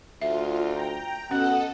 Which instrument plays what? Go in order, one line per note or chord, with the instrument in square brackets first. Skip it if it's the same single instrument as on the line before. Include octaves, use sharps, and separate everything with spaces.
[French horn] D2 [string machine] F4 [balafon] E5
[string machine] G5 A#5
[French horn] B2 [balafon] C#4 [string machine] A4 D#5 [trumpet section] F#5